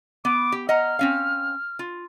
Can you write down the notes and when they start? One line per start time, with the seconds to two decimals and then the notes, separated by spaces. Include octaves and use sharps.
0.25 B3 D6
0.52 G4
0.69 D#5 F#5 A#5 F6
0.99 C4 C#4 F5
1.79 F4